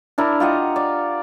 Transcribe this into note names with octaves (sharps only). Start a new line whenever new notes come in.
D4 E4 A#4
F4 G4 D#5 F#5
D5